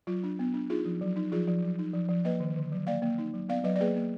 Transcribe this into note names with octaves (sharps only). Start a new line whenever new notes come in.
F#3 F4
D4
B3
D4
D#4 F4 G#4
F3
F#3
D#4
F3 F4 G#4
F3
F#3
D#4
F3
F3
A#3 B4 D#5
D#3
D3
F#3
A#3 D5 F5
A#3
D#4
F#3
B3 D5 F5
F#3 B4 D#5
D5
A#3 G#4 B4
A#3